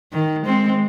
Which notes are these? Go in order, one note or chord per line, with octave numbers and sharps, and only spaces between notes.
D#3
G#3 C4